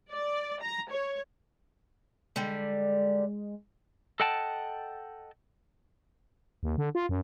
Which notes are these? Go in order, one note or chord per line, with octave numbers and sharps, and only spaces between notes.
D5
A#5
C#5
D3 G3 G#3
A4 D#5 F#5 G5 A5
D#2
D3
F4
F#2